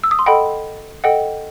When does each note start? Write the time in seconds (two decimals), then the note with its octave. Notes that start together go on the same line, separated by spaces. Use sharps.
0.04 E6
0.11 D#6
0.19 C6
0.26 A4 D#5 F#5 G5 B5
1.04 A4 D#5 F#5 G5